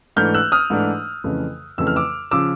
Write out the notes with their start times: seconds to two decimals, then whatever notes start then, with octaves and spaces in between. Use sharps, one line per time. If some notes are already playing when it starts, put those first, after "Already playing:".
0.16 G#2 E3 A3 D4 F6 G6
0.34 E6 F#6
0.52 D#6 F6
0.70 G#2 E3 A3 D4
1.24 F2 C#3 E3 A3
1.78 F2 C#3 E3 A3 E6
1.87 F6
1.96 D6 E6
2.31 C#3 F3 D6 E6